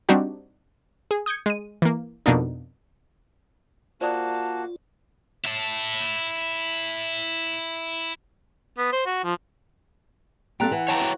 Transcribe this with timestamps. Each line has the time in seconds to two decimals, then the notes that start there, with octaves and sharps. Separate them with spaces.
0.09 G3 C4 D4 D#4 F#4 G4
1.11 G#4
1.26 D#6 G6 G#6 C#7
1.46 G#3 D#7
1.82 E3 A#3
2.26 F2 B2 A#3 D4 D#4
4.01 A#3 F4 F#4 C5 D5 A5 D#6
5.44 E4 A5
8.78 B3
8.92 C5
9.06 F#4
9.24 F3
10.60 G3 A#3 C4 A4 G5 A#5 F#6
10.71 E3 F#5
10.88 C#5 G5 A5 A#5
11.02 F#4